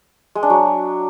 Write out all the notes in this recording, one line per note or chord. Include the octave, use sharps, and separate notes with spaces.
G#3
D4
F#3